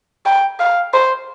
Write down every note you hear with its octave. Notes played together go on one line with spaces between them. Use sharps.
G5
F5
C5